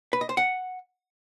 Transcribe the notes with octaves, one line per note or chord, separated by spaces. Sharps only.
B4
D#5
C5
F#5